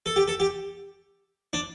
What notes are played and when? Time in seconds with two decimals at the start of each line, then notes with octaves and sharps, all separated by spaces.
0.06 A4
0.16 G4
0.28 A4
0.40 G4
1.53 D4